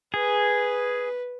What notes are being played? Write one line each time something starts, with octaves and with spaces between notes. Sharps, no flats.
G#4 B4